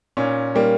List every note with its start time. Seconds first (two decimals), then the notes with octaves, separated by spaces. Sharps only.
0.17 A#2 C#4
0.55 G3 A#3